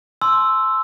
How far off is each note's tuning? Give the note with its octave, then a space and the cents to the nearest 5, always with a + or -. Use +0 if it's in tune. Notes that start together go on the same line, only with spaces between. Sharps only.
A5 -45 C6 +0 E6 +0